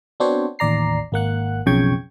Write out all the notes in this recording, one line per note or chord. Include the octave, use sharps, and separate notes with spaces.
B3 C4 D4 F#4 C5 C#5
A1 D#2 D5 A#5 C7
G#1 A#3 F#5 F#6
B1 F2 C#3 G5 C#6 G#6